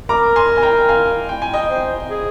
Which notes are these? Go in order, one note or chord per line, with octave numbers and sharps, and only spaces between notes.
A#4 A#5 D6
G#5 C6
G#5
G5 A#5
F5 G#5
G5
G#5
D#5 G5
C5
G#4